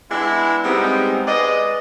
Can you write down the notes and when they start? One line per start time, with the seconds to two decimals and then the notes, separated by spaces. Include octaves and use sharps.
0.10 G#3 B3 D4 E4
0.64 G3 G#3 B3 C4 D#4
1.27 G#3 B4 D5 D#5